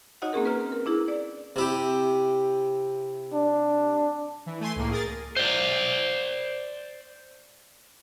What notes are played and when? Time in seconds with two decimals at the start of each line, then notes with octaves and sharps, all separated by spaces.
0.22 D#4 F#4 C#5 D#5 F#5
0.33 A#3 C4 C#4 G#4 A#4
0.45 C#4 B4 A#5 F6
0.72 A#4
0.86 D4 E4 G#4
1.08 D5
1.56 C3 E4 G4
3.33 D4
4.46 E3
4.60 A3 G#5 C6
4.76 C#2 A2 A#3
4.91 G#4 A#4 A6
5.36 C5 D5